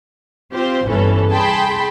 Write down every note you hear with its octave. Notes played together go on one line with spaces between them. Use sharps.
C4 F4 G4 C5
G1 C2 E3 C#4 A4
G#4 G5 A5 B5 C6